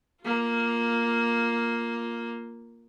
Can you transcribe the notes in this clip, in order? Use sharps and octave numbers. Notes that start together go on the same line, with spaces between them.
A#3 F4